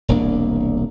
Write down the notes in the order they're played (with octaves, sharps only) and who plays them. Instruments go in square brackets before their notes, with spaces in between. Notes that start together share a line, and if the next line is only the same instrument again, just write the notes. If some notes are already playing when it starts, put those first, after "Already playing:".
[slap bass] E1 C2 A#3 D4